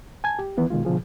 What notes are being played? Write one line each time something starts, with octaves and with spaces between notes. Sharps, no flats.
G#5 A5 G#6
G4
D#3 E3 B3 E4
B2 D#3 G#3 F4
B2 D3 F3 G#4